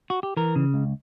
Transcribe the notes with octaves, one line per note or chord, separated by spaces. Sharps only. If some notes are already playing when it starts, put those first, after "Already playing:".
F#4
G4
E3 A#4
C#3
C#2